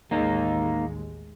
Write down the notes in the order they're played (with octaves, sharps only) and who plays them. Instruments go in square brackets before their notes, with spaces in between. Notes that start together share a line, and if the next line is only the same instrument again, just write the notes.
[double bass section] A1 D#2 G#3 [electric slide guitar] A#3 D#4